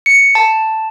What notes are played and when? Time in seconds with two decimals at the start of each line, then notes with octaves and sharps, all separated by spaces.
0.06 C#7
0.35 A5